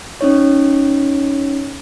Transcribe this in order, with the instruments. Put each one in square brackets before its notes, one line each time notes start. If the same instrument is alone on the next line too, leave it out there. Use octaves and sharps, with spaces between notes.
[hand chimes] C#4 D#4 C#5